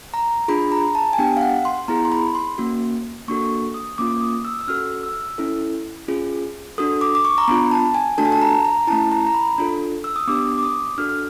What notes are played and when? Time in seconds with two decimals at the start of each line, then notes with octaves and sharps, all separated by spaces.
0.14 A#5
0.48 D4 F4 G#4 B5
0.72 A#5
0.95 A5
1.13 G#5
1.18 B3 D4 G4 G5
1.37 F5
1.41 F#5
1.65 C6
1.88 B3 E4 G#4 A#5
2.05 C6
2.12 B5
2.35 C6
2.58 A#3 C#4 F#4
3.28 A#3 D4 F#4 A4 C#6
3.74 D#6
3.98 A#3 C#4 F4 D6
4.21 D#6
4.45 E6
4.61 E6
4.68 C#4 F#4 A4 F6
5.03 E6
5.38 C#4 E4 A4
6.08 C#4 F4 G#4
6.78 D4 F#4 A4 D#6
7.01 D6
7.15 D6
7.25 C#6
7.38 A#5
7.48 B3 D4 F4 B5
7.71 A5
7.95 G#5
8.18 A3 D4 F#4 A4 A5
8.25 G#5
8.32 A5
8.42 A#5
8.65 A#5
8.87 A3 C#4 E4 A5
9.12 A#5
9.27 A#5
9.35 B5
9.58 D4 F4 A4
10.04 E6
10.16 D#6
10.27 B3 D4 G4 D6
10.58 D6
10.63 D#6
10.98 D4 F#4 A4 F6
11.09 F6